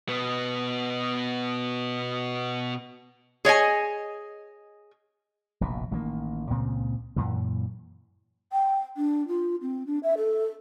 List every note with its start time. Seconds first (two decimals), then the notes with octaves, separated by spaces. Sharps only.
0.09 B2 B3
3.45 G#4 C#5 D#5 G#5
5.61 F1 A#1 B2
5.91 A1 D#3 G3 A#3
6.50 C#2 A#2 C#3 C4
7.16 F#2 A#2 E3
8.52 G5
8.97 D4
9.28 F4
9.62 C4
9.87 D4
10.03 E5
10.17 A4